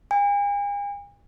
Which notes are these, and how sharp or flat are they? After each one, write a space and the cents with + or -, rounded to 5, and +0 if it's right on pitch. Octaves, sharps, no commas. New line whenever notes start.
G#5 -40